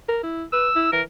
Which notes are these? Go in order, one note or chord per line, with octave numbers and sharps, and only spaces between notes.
A#4
E4
B4 E6
E4
E3 A#4